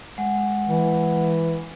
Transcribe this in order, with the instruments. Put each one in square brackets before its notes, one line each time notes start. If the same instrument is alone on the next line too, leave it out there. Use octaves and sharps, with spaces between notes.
[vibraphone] G#3 F#5
[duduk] E3